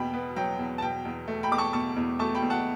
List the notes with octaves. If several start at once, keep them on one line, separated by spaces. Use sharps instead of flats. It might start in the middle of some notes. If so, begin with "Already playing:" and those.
Already playing: E2 B2 B3 G5 B5
B3
F#3 G5
E2
A5
B2 G5
E2
A3
G5 B5
E2 D6
A5 C#6
B2 A5 C#6
E2
A3 A5 C#6
G5 B5
E2
F#5 A5